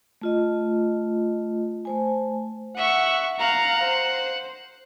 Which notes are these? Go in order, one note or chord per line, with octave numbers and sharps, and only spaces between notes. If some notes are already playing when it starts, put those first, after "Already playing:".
A3 F4 D#5
A3 C5 G#5
E5 F#5 C#6
F5 F#5 A#5
C5